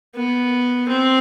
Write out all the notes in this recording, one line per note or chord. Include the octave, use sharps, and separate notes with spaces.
B3
C4